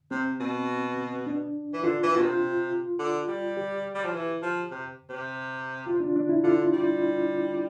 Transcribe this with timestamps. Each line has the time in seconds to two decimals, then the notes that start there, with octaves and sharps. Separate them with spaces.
0.11 C3 C4
0.40 B2
1.27 D4
1.74 E3
1.84 D3 F4
2.03 E3
2.12 B2 F4
2.22 C3
2.99 D3
3.28 G3
3.57 G4
3.95 G3
4.04 F3
4.14 E3
4.42 F3
4.71 C3
5.10 C3
5.86 F4
6.00 D4
6.16 D4
6.29 E4
6.43 D3 F4
6.73 G3